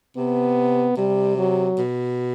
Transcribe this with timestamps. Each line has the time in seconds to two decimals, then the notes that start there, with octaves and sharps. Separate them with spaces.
0.17 C3 B3
0.97 C3 G3
1.38 F#3
1.79 B2